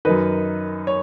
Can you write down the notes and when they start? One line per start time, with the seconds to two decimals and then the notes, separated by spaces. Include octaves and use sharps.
0.05 F#2 D#3 B4 D#5
0.87 C#5